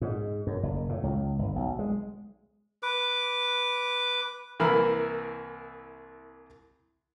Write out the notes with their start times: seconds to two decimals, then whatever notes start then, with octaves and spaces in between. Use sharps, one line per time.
0.01 G#2
0.47 F#2
0.63 F#1
0.89 A2
1.03 C#2
1.39 G1
1.56 B1
1.79 G#3
2.83 B4 D6
4.60 C2 E3 A#3 A#4 B5